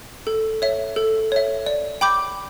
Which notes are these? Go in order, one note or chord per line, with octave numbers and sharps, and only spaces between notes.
A4
C#5 E5
A4
C#5 E5
D5
G5 B5 D6 G6